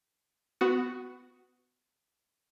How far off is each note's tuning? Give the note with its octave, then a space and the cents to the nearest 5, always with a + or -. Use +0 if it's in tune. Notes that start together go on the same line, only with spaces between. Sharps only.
B3 +25 F#4 +0